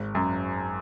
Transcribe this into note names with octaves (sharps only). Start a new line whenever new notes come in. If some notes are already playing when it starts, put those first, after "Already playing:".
Already playing: G#1
F#2